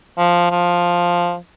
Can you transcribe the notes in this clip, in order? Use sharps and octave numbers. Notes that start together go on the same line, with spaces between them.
F3
F3